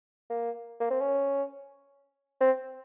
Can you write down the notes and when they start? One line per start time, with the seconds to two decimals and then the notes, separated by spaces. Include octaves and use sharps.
0.30 A#3
0.80 A#3
0.90 C4
1.01 C#4
2.41 C4